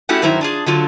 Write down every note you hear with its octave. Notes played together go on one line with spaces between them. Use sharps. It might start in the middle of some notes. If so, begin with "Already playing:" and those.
A3 C#4 E4 F#4 G4 F#5
G2 D#3 F#3 E4 C5 A#5
D4 F4 G#4
D3 F#3 F4